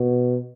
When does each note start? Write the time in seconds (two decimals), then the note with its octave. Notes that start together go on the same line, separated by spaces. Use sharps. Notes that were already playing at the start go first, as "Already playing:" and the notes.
Already playing: B2